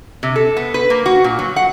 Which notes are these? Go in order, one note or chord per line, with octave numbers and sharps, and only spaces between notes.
C3
A4
B3
B4
A#3
F#4
A#2
F#3
F#5